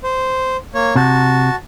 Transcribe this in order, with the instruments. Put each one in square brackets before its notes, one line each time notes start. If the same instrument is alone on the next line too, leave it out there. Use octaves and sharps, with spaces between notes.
[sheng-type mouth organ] C5
A#3 C#5
[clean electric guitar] C3 [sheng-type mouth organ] F#4 A5